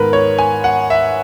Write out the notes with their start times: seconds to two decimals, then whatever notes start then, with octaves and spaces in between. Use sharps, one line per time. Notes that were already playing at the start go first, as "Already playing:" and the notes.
Already playing: G#2 D#3 G#3 B3 A#4 B4
0.13 C#5
0.39 G#5
0.64 F#5
0.90 E5